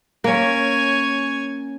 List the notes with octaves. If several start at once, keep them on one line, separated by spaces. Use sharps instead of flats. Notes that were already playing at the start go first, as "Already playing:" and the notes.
A#3 C#4 C#5 G#5